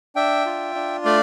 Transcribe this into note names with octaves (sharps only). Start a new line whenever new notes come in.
D4 E5 G5
F4
D4
A3 D5 F5